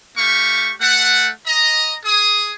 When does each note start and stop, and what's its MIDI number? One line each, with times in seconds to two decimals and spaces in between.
0.17 0.72 57
0.17 0.72 67
0.17 0.72 77
0.17 0.72 85
0.81 1.31 57
0.81 1.31 78
1.46 1.95 75
1.46 1.95 82
2.05 2.54 68
2.05 2.54 87